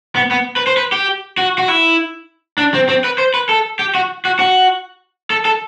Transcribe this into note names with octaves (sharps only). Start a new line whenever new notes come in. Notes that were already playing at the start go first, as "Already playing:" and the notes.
B3
B3
B4
C5
B4
G4
F#4
F#4
E4
D4
C4
C4
B4
C5
B4
A4
G4
F#4
F#4
F#4
A4
A4